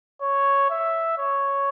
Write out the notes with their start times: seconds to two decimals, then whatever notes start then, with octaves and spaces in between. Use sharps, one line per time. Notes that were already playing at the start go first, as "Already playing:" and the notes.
0.22 C#5
0.70 E5
1.18 C#5